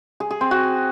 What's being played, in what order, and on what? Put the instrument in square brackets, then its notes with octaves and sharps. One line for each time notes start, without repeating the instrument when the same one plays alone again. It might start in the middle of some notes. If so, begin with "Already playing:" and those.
[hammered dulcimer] G#4
G#4
C4
F#4